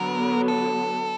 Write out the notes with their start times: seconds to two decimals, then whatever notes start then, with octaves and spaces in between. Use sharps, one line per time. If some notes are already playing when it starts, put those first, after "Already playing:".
Already playing: D3 F#3 B3 A#4
0.48 A4